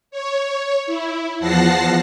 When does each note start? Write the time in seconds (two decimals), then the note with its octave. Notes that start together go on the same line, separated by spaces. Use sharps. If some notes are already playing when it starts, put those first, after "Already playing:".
0.11 C#5
0.86 E4
1.40 E2 F3 F#5 A5 A#6 C7